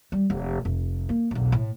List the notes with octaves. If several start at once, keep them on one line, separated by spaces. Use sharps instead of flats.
G3
F1
F1
A#3
E1 B1
A2